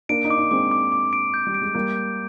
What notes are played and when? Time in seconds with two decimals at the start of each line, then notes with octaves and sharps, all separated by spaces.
0.09 A#3 D4 D7
0.25 D#4
0.30 D6
0.38 D4
0.51 G#3 C4 D6
0.71 D6
0.92 D6
1.13 D7
1.34 G6
1.47 G3
1.54 D7
1.62 G#3
1.75 G3 A#3 G6
1.96 G6